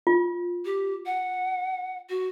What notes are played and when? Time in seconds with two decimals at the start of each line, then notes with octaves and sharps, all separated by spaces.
0.07 F4
0.65 G4
1.06 F#5
2.10 F#4